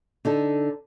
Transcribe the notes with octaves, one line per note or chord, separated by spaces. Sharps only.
D3 D#4 A4